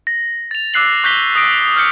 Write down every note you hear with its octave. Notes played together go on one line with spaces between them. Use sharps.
A#6
A6 F7
D6 E6 F#6 C7 F#7
C#6 F#6 G6 A#6 B6 G7
D#6 E6 A#6 D7
F6 G6 C#7